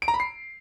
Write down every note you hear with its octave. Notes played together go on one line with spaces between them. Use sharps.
D7
A#5
B5
C7